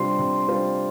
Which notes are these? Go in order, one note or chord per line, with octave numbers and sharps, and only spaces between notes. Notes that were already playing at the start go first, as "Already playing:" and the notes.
Already playing: C3 G3 D4 F4 C5 C6
C3
G3 D4 F4 C5